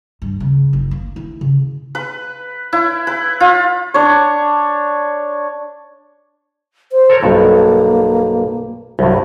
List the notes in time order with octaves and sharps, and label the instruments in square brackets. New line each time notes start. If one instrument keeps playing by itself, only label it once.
[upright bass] G2
C#3
F#1
A#3
E4
C#3
[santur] B4
E4
B4
F4
D4 C#5
[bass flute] C5
[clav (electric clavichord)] A4 A#4 C#5
[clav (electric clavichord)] B1 G2 [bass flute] A#3
[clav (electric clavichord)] C2 G2 [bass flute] F#3